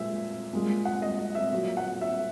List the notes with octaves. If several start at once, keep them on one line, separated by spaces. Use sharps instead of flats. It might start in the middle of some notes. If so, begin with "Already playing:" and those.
Already playing: A#2 G#3 E5
A#2 G#3
F#5
D#5
D#5
E5
A#2 F#3
F#5
E5